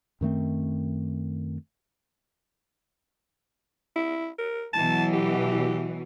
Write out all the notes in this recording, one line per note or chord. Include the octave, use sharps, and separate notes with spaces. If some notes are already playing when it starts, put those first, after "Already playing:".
F#2 D#3 A3 C4
E4
A#4
B2 E3 F#3 A5
G4